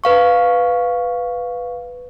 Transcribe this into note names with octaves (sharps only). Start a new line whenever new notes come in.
B4 F5 C#6